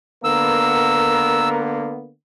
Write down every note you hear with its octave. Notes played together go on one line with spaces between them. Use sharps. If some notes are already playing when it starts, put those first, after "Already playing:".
D3 A#3 B3 A#4 E6